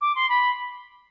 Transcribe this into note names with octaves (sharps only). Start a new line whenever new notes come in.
D6
C6
B5